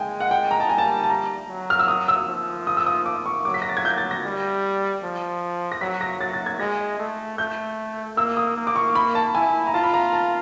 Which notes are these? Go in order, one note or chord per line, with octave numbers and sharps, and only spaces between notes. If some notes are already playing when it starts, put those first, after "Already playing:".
Already playing: G#3 G5 G#5
F#5
G5
A#5
A5
G3 G#5
A5
A5
A#5
F#3
F6
E6
D#6
E6
F3
D#6
E6
D#6
D6
C#6
F#3 D6
B6
A#6
A6
G#6
G6
A6
A#6
G3
F3
A#6
F#3 B6
A#6
F#3 A6
A6
G#6
G#3 A#6
A3
A3 G6
A#3 E6
D#6
A#3
D6
C#6
B5
A5
E4 G#5
A#5
F4 A5
B5
A#5
A5